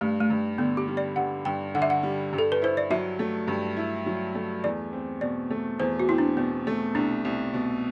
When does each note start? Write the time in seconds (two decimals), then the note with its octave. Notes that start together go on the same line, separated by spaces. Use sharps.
0.01 G2 A3
0.20 A3
0.30 G2
0.58 D3 B3
0.77 G4
0.87 G3
0.97 D5
1.16 G2 F#5
1.45 G2 G5
1.74 D3 F#5
1.82 E5
1.90 F#5
2.03 G3
2.33 G2
2.38 A4
2.52 B4
2.62 E4 C5
2.77 D5
2.90 F#3 E5
3.19 A3
3.47 G2
3.77 E4
4.06 F#3
4.35 A3
4.64 E2 D5
4.93 C4
5.21 B2 D5
5.50 A3
5.79 E2 C5
6.00 F#4
6.09 C4 E4
6.18 D4
6.37 B2 B3
6.67 A3
6.95 C2 D4
7.25 C2
7.53 B2